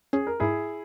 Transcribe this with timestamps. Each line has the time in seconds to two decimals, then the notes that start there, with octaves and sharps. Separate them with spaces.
0.13 C#4 G#4
0.27 A#4
0.40 G#2 E4 G#4